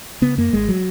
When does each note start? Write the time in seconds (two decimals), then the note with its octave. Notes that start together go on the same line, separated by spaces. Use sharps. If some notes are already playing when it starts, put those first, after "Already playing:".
0.22 C#3 B3
0.37 F#2 A#3
0.53 G#1 G#3
0.68 F#3